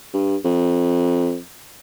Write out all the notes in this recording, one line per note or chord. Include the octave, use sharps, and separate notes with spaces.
G2
F2